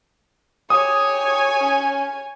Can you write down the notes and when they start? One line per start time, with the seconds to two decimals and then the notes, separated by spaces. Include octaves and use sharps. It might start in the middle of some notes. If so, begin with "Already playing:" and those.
0.70 G4 C#5 G#5 D#6
1.60 C#4